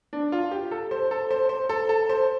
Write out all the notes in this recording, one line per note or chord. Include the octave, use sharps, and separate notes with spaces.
D4
F4
G4
A4
C5
A4
C5
C5
A4
A4
C5